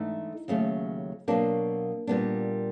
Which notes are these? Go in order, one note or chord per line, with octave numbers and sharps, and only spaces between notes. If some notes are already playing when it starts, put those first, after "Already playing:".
Already playing: G#2 E3 A3 D4 D#4
D#2 C#3 F#3 A3 C#4
B2 F#3 A#3 D4
A#2 G3 B3 D4